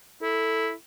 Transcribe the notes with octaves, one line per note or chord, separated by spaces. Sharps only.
E4 A4